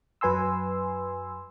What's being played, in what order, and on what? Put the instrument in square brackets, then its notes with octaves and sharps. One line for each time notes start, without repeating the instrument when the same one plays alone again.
[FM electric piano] F#2 F#3 B4 G#5 C6 E6